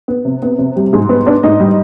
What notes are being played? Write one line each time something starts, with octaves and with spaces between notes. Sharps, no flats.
B3
C3
B3
C3
G3 G4
G#2 G#4
B3 B4
B3 D4 D5
G#2 D#4 D#5
G3